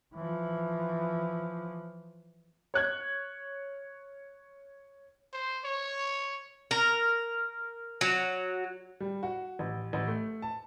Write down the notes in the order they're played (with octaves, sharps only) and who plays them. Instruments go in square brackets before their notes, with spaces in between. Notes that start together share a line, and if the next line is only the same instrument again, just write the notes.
[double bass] E3 F3
[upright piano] C#5 F#6 G#6
[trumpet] C5
C#5
[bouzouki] A#4
F#3
[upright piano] G3
F#4
A1
A1
A3
A5